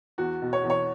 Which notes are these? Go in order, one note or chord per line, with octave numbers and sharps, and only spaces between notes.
E2 F#4
B2
C#5
E2
C#5